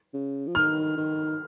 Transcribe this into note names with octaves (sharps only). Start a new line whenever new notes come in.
C#3
F3
D#3 F6
D#3